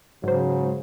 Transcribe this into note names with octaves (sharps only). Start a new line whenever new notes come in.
G#2 C#3 F#3 C5